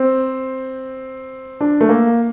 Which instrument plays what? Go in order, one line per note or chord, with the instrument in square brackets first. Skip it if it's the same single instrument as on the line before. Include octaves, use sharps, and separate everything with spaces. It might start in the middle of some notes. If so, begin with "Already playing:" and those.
Already playing: [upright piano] C4
D4
A3
A#3